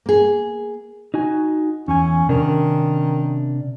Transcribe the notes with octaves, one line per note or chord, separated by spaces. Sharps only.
A#3 G#4
D#4 F#4 G#5
E2 C#4 G#5
C3 D#3 C#4 D4